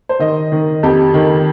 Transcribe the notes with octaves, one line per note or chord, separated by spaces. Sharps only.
C5
D#3 D#5
D#3
F2 G4
D#3